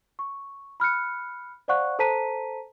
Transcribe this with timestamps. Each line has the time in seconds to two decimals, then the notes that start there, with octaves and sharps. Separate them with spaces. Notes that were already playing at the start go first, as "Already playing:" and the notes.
0.19 C#6
0.80 B5 F6 F#6 C#7
1.68 C5 D5 F5 F#5 C#6 F#6
1.99 A4 C5 A5 A#5 B6 D#7